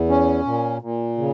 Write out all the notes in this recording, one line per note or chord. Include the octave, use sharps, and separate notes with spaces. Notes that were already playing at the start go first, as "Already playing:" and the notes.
Already playing: E2
C#4
A#2
A#2
C#3